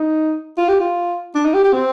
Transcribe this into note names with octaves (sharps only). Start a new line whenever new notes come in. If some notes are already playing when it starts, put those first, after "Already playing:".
Already playing: D#4
F4
G4
F4
D4
D#4
G4
G4
C4